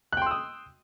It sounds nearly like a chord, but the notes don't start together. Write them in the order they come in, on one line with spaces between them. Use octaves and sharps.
F#6 G5 C6 E6 D#6